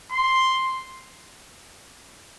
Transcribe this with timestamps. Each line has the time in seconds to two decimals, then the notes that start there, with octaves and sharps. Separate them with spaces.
0.11 C6